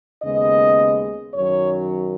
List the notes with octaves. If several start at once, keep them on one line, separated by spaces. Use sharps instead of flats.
D#2 C#3 G#3 B3 D#5
F#2 D#3 F#3 C#5